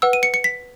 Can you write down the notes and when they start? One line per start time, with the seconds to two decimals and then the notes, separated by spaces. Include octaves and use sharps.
0.02 B4 F#5 E6
0.13 D#7
0.23 C#7
0.34 C#7
0.44 B6